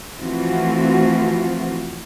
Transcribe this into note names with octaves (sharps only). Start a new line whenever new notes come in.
E3 F3 A3 C4 F4 F#4